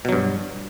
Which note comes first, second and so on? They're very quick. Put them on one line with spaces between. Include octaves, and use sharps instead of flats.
B2 F#3 G2